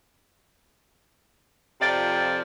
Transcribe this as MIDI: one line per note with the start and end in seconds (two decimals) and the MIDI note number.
1.81 2.41 41
1.81 2.41 48
1.81 2.41 53
1.81 2.41 74